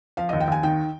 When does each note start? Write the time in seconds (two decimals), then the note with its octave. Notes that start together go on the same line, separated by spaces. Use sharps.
0.17 F3 F5
0.29 D#2 D#5
0.40 G5
0.48 D#2 G#5
0.63 D#3 G5